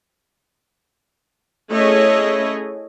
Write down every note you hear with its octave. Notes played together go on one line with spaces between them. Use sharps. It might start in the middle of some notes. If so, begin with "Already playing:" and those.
A3 C#4 E4 G#4 C#5 D#5